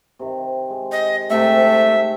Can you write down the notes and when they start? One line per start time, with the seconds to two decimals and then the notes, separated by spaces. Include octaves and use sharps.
0.19 C3 D#3
0.70 G#3
0.92 D#5
1.30 G#2 C3 A3 E5 G5